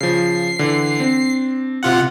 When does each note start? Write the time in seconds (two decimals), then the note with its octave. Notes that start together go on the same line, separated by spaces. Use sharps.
0.01 C#3 F3 C7
0.59 D3 E3
1.00 C4 D4
1.83 C3 F4 F#5